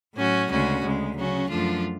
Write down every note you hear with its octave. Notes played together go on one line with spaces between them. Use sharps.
A2 F#3 C#4 F#4
D2 C#3 G#3 C#4 F#4
D2 C#3 G#3
C#3 F#3 C#4 F#4
F#2 F3 A3 D4 F4